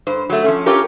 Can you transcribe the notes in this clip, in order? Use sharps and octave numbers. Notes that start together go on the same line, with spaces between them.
G2 C5
F#3 A3
F3 C#4
C#4 F4 G4 A4 A#4 C#5